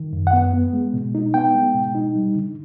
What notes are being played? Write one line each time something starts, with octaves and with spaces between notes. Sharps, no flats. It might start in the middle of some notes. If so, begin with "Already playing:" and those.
Already playing: D#3
F#2
F#5
B3
B3
G#3
B2
D#4
B3 G5
G#3
B2
D#4
G3
D3